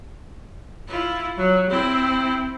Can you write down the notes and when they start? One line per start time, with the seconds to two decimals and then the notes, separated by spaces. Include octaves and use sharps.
0.88 E4 F4
1.37 F#3
1.70 C4 E4